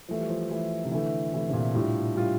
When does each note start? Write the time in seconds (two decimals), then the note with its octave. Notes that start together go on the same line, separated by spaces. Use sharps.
0.08 E3 F3 A3 E4
0.19 G3
0.30 F3
0.50 E3 A3 E4
0.85 C3
0.91 D3 E3 A3 E4
1.33 C3 E3 A3 E4
1.49 C3
1.53 A#2
1.74 A2 G3 D4 F4
2.16 G3 D4 F4